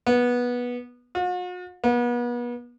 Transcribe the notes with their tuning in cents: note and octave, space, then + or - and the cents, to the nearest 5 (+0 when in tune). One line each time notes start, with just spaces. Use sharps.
B3 -15
F#4 -45
B3 -35